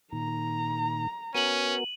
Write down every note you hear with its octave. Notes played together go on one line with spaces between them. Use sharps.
A#2 D#3 A#5
B3 C#4 F#4 A#4 D#7 F#7